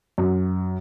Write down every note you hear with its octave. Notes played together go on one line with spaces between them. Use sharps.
F#2